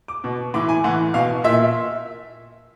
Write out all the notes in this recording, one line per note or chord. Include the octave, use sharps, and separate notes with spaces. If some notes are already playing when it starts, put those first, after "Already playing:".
D6
B2
A2 E3 D6
G#5
A2 E3 F#5
B2 F5
A#2 E5